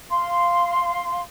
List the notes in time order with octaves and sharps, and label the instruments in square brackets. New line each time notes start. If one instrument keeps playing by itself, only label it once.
[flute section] F5 C6